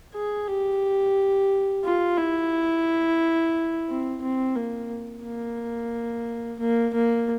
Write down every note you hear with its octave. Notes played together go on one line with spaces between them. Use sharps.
G#4
G4
F4
E4
C4
C4
A#3
A#3
A#3
A#3